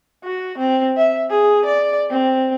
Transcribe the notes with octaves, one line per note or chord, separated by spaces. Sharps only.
F#4
C4
E5
G#4
D5
C4